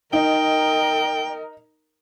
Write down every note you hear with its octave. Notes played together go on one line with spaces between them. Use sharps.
D#4 A#4 D#5 G5